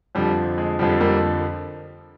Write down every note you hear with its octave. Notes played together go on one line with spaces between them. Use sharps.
F2 D3 F3 G3
G#3
F2 D3 F3 G3
G3 A#3